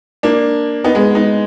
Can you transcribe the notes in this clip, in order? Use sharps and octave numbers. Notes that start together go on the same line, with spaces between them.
A#3 D4
B3 D#4
G#3 B3
B3 D#4